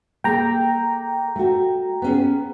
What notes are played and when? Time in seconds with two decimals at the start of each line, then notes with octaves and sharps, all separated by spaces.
0.24 A#3 G#4 A4 G5 A#5
1.36 A3 F#4
2.02 B3 C#4 G#4